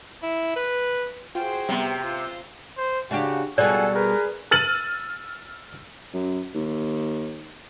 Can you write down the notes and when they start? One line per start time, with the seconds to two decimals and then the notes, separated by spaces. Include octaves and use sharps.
0.23 E4
0.56 B4
1.35 F4 F#4 G#4 C5 G5
1.69 C3 G3 B3
2.01 F4 C5
2.77 C5
3.11 C#3 D4 F#4 G4
3.58 C#2 B2 G3 A4 D5 F#5 G#5
3.95 G#4 A#4 B4
4.51 E6 F6 A6 D#7 F#7
6.13 F#2
6.54 D#2